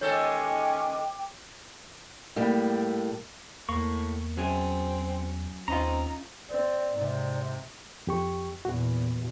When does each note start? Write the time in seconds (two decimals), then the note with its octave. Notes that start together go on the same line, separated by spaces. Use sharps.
0.01 D#2 G#3 C#4 A4 C#5 G5 D6
2.36 A2 G3 A#3
3.69 E2 A2 A#3 C#6
4.37 F#3 C4 C#4 G#4
5.68 D#2 C4 C#4 D#4 F4 A#5
6.50 C4 D5
6.94 G#2 C3
8.07 F2 G4 C#6
8.65 E2 A#2 F#4